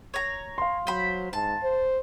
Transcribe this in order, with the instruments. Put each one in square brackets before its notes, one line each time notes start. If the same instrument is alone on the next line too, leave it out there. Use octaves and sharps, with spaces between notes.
[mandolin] C#5 A#5
[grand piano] F5 C6
[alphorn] F#3 [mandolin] C5 B5
[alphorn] G#2 [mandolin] A5
[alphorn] C5